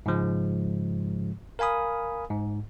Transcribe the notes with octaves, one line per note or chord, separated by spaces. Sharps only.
G#2 C#3 F3 G#3
A#4 F5 G#5 B5 D#6
G#2